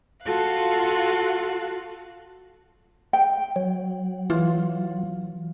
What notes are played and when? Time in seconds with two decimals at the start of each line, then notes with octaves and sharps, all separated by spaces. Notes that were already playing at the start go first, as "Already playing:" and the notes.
0.23 F4 F#4 A4 F5 F#6
3.13 G5
3.56 F#3
4.30 E3 F4